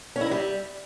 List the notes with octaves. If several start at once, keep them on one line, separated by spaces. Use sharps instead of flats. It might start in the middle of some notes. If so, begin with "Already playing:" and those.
C#4
E4
D#4
G3